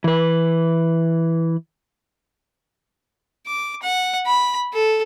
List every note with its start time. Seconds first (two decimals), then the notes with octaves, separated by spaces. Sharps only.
0.04 E3 B4
3.46 D6
3.83 F#5
4.27 B5
4.73 A4